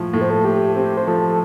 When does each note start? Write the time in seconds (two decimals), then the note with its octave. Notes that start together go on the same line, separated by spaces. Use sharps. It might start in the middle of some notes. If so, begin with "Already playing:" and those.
Already playing: A2 F3
0.13 A2 A4
0.21 C5
0.30 A4
0.45 A3 G4
0.76 C4 G4
0.97 C5
1.07 F3 A4
1.28 A4